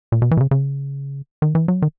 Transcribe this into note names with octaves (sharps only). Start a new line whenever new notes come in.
A#2
B2
E3
B2
C#3
C#3
D#3
E3
F#3
D#3